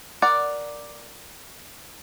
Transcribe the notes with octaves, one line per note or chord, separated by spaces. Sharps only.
A#4 D5 F#5